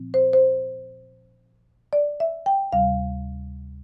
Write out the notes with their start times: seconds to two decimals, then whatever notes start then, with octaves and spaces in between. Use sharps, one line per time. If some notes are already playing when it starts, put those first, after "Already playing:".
Already playing: A#2 F3 C4
0.14 C5
0.33 C5
1.93 D5
2.20 E5
2.46 G5
2.73 D2 C3 G3 F5